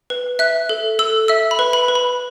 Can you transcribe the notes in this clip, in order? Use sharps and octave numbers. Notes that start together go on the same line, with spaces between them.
B4
E5 F#6
A4
A4 E6
E5 E6
B5
B4
B5
B4
B5